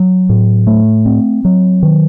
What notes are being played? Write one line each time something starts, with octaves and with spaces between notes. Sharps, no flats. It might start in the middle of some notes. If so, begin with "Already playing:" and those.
Already playing: F#3
A2
A3
C4
F#3
D#3